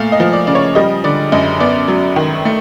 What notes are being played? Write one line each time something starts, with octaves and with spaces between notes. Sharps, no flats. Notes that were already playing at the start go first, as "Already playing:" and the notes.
Already playing: A#2 A3 F5
D#5
F3
D5
C#3 D5
C#5
G3 D#5
D3 D5
F#2 D#5
B3 D5
F#3
D#3
A3